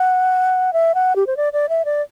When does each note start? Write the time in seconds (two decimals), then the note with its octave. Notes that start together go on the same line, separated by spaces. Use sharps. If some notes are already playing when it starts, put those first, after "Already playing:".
Already playing: F#5
0.73 E5
0.95 F#5
1.16 G4
1.27 C5
1.37 D5
1.53 D5
1.69 E5
1.85 D5